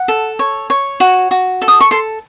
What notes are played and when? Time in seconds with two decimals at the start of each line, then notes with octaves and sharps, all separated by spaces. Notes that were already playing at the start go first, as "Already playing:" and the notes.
Already playing: F#5
0.08 A4
0.39 C#5
0.70 C#5
1.00 F#4
1.31 F#4
1.62 A4
1.68 D#6
1.81 C#6
1.91 A4 C6